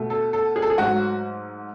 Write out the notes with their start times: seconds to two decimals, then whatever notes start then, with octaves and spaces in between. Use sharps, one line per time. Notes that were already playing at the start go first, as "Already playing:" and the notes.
Already playing: B2 A3
0.10 A4
0.33 A4
0.56 G#4
0.62 A4
0.70 G#4
0.78 G#2 F#3 A3 F#4